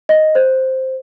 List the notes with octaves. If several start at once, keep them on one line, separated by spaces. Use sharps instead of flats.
D#5
C5